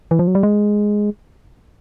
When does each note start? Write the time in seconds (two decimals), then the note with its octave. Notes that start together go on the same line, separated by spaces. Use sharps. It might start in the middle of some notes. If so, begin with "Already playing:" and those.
0.11 E3
0.19 F3
0.27 F#3
0.35 G3
0.43 G#3